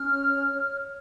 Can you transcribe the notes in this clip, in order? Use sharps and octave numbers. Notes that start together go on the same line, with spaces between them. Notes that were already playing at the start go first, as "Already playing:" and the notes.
Already playing: C#4 F6
C#5
C#5
C#5
C#5